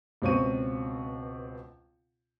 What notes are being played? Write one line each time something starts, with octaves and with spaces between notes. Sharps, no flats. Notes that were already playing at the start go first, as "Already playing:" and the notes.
C#2 B2 C4 C#5 C#6 D#7